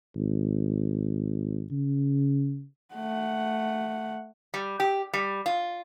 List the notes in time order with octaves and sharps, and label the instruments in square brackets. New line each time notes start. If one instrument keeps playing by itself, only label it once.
[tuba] G#1
C#3
[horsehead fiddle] A3 F#5
[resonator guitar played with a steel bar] G3
G4
G3
F4